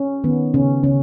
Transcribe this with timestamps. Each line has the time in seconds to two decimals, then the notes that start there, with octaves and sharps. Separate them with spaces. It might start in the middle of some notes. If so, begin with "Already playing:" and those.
Already playing: C#4
0.24 D#3 B3
0.54 C#3 C#4
0.84 C#3 C#4